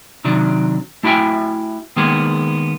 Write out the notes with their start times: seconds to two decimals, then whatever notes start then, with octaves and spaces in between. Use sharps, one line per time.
0.25 C3 D#3 F#3 D4
1.03 A3 E4 F#4 E5 G5 G#5
1.96 D#3 G#3 A#3 B3 G#4